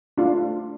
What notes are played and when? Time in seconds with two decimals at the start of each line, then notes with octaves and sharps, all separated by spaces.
0.18 A3 D4 F4